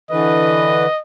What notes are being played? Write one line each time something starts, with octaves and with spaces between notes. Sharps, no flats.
D3 E3 B4 D#5